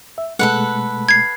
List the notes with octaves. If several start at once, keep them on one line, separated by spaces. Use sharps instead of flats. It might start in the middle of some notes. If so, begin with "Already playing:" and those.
E5
B2 G#3 A3 A4 B4 F#5
G#6 C7